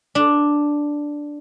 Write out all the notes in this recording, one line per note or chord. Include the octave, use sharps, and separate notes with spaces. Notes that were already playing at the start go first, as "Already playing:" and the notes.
D4